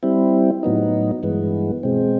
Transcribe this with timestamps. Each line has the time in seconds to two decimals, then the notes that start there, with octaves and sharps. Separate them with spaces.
0.03 G3 C4 E4
0.63 A2 F#3 B3 D#4
1.23 G2 E3 G#3 B3
1.83 B2 G#3 C4